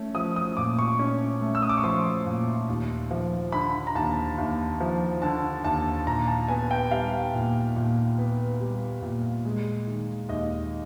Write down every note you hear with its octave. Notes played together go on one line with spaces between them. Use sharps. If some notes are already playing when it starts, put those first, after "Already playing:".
Already playing: A3 C#4
F3 D#6
D#6
A#2 D6
C#6
C#4
A3
E6
D#6
D6
C#6
F3 C6
A#2
D#2
F3
D3 B5
A#5
D#2 A5
D#2
F3
D3 A5
D#2 A5
A#2 A#5
A5
B3 G#5
G5
G3 F5
A#2
A#2
B3
G3
A#2
G#3
D#3
D#2 D#5